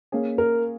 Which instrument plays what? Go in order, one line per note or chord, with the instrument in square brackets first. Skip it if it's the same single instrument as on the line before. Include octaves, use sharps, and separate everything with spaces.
[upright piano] A#3 C#4 G#4
[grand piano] A#4